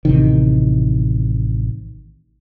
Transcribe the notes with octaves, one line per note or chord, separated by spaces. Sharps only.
A1 C3 D#3